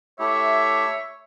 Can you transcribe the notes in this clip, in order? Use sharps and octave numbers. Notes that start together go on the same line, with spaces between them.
A3 E4 G4 C#5 E5